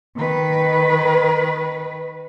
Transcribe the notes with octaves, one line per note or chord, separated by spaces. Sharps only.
D#3 B4